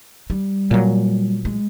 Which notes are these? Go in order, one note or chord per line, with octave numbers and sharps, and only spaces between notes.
G3
A#2 F#3
G#3